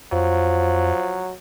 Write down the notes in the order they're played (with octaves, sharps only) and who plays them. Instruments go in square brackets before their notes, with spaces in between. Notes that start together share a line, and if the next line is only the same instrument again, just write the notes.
[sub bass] F2 [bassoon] F3 [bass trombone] F#3